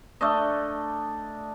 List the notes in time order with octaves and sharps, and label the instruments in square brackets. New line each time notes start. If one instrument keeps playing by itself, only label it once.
[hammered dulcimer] A3 D4 D#5